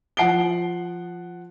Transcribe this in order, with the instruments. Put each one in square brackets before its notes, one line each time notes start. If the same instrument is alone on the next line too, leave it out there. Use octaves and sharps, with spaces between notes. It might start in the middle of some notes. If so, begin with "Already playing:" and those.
[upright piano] F3 F#5 C7 D7 G7